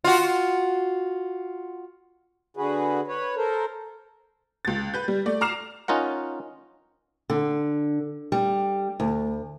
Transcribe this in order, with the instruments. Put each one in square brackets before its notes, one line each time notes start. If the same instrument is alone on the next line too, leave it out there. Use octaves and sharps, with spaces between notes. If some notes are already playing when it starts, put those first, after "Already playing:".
[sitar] F4 F#4
[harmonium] D3 F#4 G#4 B4
B4 C#5
A4 A#4 C5
[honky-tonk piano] C#2 A6
B4 G6
G3
A3 D5
A#5 D6 F6 C7 E7 F7
[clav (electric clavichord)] C#4 D#4 F4 A#4 F#5
[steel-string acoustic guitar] D3
G3
D2